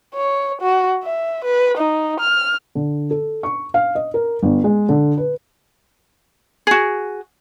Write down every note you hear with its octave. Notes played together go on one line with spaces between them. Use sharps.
C#5
F#4
E5
B4
D#4
F6
D3
A4
C#6
F5
D#5
A#4
G1
G#3
D3
B4
F#4 G#4